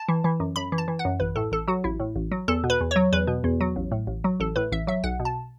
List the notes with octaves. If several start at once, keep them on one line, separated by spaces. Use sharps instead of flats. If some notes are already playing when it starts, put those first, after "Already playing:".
Already playing: A5
E3
E3
F#2
F#2 B5
E3
A5
E3
F#5
F#2
A1 B4
A2 A4
A1 A4
F#3 F#4
A1 E4
A2
A1
F#3
E2 A4
B2
B4
E2
F#3 C#5
E2 B4
B2
E2
F#3
A1
A2
A1
F#3
A1 A4
A2 B4
A1 E5
F#3 E5
B1 F#5
B2
A5